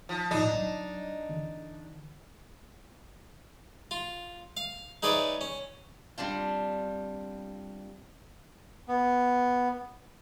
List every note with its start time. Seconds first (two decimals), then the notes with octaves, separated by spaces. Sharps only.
0.09 F3
0.31 A2 F3 D4 D#4
0.53 F#3
1.29 D3 E3
3.91 F4
4.57 F5
5.03 D#4 G#4 B4 C#5 D5 E5
5.41 C#4
6.18 G3 C4 D4 F4
8.88 B3